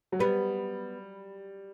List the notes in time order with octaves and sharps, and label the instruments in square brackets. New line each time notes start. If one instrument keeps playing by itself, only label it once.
[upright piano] F#3
[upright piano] G3 [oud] B3